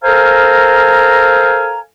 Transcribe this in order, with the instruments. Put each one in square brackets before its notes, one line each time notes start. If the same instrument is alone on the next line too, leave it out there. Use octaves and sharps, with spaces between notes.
[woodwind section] A4 A#4 C5 F5 G#5 A#5